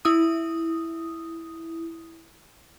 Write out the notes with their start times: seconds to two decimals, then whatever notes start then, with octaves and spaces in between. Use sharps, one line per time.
0.05 E4 D#6